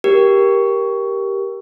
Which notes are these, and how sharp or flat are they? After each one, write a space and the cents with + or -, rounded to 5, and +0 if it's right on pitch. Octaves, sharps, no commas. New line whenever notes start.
G4 +0 A#4 +10